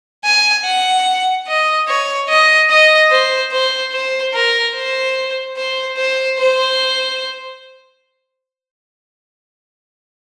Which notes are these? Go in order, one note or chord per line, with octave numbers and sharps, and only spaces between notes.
G#5
F#5
D#5
C#5
D#5
D#5
C5
C5
C5
A#4
C5
C5
C5
C5